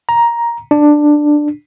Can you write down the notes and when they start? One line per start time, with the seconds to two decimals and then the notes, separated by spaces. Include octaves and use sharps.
0.09 A#5
0.71 D4